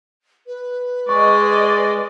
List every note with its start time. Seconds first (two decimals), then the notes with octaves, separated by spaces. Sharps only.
0.46 B4
1.09 G#3 D5 D#5 C#6